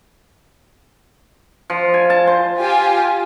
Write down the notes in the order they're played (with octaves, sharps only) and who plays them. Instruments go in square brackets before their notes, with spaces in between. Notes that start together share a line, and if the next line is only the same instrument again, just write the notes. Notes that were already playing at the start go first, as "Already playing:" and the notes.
[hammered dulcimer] F3
G#5
A5
C5
[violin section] F4 G4 G#5